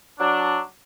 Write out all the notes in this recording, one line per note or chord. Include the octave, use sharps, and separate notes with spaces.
F#3 D4